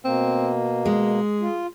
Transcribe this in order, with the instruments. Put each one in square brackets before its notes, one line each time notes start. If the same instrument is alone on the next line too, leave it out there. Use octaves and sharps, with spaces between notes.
[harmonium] B2 A#3 [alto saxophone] C4
[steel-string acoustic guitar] G#3 [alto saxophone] G#4
[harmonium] F4